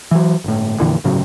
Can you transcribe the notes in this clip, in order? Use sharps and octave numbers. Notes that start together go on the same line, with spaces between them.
E3 F#3
G1 A2
F2 A#2 D3 E3
G1 A2 C#3 F#3